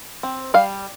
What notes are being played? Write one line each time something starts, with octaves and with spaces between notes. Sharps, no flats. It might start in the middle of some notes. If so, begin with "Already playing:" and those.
C4
G3 F5